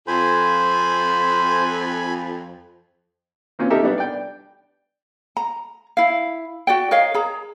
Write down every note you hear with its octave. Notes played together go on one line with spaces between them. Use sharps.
F2 C5 G#5 B5
A#3 C4 C#4 F4
D#4 G4 A4 A#4 E5
G3 B3 D4
D5 G5
A#5
E4 F5
F#4 D5 G5
A#4 C#5 D#5 F5
G#4 A#5